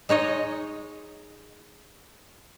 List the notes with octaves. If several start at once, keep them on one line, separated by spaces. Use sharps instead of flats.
G#3 D#4 C#5 D#5